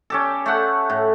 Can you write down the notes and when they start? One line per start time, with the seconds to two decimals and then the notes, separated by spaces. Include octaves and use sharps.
0.10 C#4 G4 A4
0.46 A3 F#5
0.90 A2